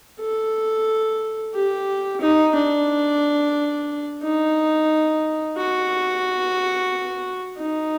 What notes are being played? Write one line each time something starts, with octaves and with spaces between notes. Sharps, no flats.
A4
G4
D#4
D4
D#4
F#4
D#4